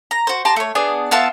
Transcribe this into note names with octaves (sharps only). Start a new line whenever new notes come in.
A#5
F#4 C5
G4 A5 A#5 C6
A3 C#5
B3 D4 G#4
B3 F4 E5 A5